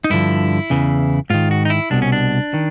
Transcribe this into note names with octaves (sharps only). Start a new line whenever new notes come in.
D#4
G2 D3 F3 E4
E2 C#3 E3
G#2 D#3 F4
F#4
D#4
E4
C2 B2 D4
C#4
D4
D#3